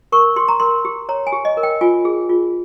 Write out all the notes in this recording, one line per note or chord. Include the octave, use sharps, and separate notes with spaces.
A#4 C#6
G4 C6
A#5
A#4 C6
G4
C#5 A#5
G#5
G4
D#5
A#4
G5
F4 G#5
G#4
F4